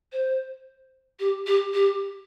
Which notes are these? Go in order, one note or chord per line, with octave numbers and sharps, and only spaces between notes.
C5
G4
G4
G4